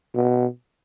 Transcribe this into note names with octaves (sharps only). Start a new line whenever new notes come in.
B2